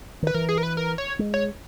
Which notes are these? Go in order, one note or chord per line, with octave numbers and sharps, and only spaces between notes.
D#3 B4
E3 A#4
G#4
A#4
B4
A#4
C#5
G#3
C#5